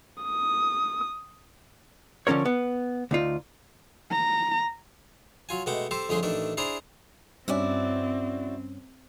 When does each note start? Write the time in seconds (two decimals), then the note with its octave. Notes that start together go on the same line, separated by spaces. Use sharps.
0.23 D#6
2.27 D3 F3 C#4 A#4 C#5
2.46 B3
3.11 D2 D#4 F4
4.12 A#5
5.49 F#3 F4 G#5
5.66 B2 G#3 A3 F#5 G5 D6
5.91 C4 G4 A4 C5
6.09 F2 D3 A3 C#4 G#4 C6
6.23 A1 D#3 A3 D4 A4
6.57 D4 E4 G#4 C5 D5 A#5
7.48 G2 C4 C#4 E4 F#4 D5